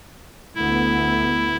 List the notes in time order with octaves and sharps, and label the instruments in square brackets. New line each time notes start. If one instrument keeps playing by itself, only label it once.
[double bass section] D2 A3 B3 [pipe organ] E4